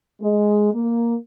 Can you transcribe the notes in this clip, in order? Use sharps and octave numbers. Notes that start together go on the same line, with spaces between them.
G#3
A#3